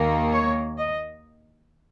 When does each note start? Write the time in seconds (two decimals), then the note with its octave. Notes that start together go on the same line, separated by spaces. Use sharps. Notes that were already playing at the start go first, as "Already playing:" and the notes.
Already playing: D#2 D#3 A#3
0.32 C#5
0.78 D#5